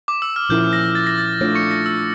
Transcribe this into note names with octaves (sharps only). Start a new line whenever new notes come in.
D6
E6
F6
A#2 F3 C#4 E4 A#4 G6
A#6
A6
A#6
A6
A3 D4 F4 C#5
C#6 C#7
A#6
E6